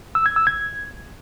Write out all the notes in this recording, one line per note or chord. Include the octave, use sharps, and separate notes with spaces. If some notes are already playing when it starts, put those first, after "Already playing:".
E6
G#6
E6
G#6